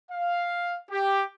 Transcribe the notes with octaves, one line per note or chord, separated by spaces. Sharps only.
F5
G4